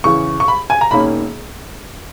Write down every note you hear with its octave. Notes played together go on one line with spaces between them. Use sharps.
E2 C#3 E3 C#6
C#6
B5
G#5
A#5
E1 D#3 A#3 C#4 B5